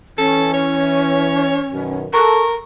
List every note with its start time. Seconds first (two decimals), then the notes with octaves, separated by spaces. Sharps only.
0.18 E3 C#4 A4
0.54 C#5
1.72 F#2 B2 D#3
2.14 A4 A#4 C#6